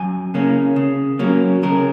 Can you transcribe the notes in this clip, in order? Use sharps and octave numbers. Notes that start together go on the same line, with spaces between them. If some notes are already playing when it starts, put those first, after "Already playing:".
Already playing: F#2 G#5
C#3 A#3 C#4
C#3
F#3 A#3 C#4
C#3 A#4